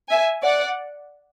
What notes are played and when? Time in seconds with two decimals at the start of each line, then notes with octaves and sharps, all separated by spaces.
0.10 E5 G#5
0.43 D5 F#5